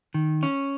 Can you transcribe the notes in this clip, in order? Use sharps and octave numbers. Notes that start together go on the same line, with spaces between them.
D#3
C#4